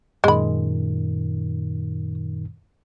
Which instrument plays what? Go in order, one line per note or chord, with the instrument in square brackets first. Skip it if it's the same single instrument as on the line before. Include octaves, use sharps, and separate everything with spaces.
[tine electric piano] F#2 A#2 D#3 [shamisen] G#3 B5